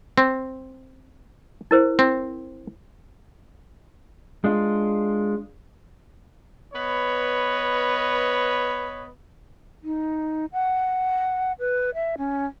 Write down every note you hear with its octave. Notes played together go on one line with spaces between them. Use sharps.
C4
E4 A#4 C5
C4
G#3 D4 F4
B3 B4 C#5 D#5
D#4
F#5
B4
E5
C#4